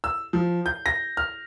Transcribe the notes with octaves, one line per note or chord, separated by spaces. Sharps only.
E6
F3
G6
A#6
F6